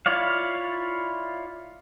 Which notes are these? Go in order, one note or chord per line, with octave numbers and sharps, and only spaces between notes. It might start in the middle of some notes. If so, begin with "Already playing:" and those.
E4 F4 C#5 D5 F5